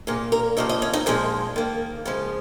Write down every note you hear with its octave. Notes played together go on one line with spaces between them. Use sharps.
A#2 A#3 G#4
A#4
C#3 F3 A#3 D#5
D#5
C#4
D#4
A#2 F3 G#3 G#4
D#3 A#3
C#3 F3 G#3